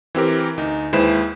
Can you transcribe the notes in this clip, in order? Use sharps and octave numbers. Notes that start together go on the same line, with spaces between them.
E3 C4 G4 A#4
D2 D#4
D#2 G#3 E4 B4 C5 E7